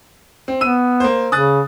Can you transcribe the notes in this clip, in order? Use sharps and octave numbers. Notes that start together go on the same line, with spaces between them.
C4
B3 E6 D#7
A#3 C5
C#3 D#6 F#6 A6